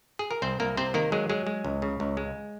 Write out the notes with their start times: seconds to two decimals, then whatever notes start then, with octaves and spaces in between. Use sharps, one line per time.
0.19 G#4
0.31 A#4
0.42 C2 C4 C5
0.60 C2 A#3 A#4
0.77 C3 C4 C5
0.94 D#3 A#3 A#4
1.12 F#3 G#3 G#4
1.29 F#3 G#3 G#4
1.47 G#3
1.65 C#2
1.82 C#3
2.00 C#2
2.17 G#3